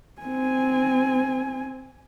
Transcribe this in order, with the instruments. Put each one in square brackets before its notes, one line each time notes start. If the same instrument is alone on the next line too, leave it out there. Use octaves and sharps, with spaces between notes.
[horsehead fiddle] C4 G#5